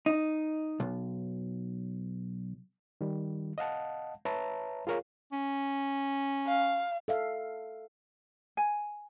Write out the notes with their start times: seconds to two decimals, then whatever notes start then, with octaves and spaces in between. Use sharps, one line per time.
0.06 D#4
0.80 B1
3.01 D#3 G3
3.58 D#5 F5 F#5 A5
4.25 B4 C#5 E5 A5 A#5
4.87 F4 G#4 A#4 C#5 F5
5.32 C#4
6.47 F5
7.08 A4 E5 F5
8.57 G#5